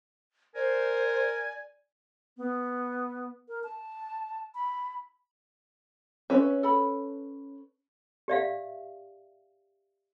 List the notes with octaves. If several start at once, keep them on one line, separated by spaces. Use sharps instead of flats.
A#4 C5 D5 G#5
B3
A#4
A5
B5
C#4 B4 E5
A4 B5
G4 D5 E5 F5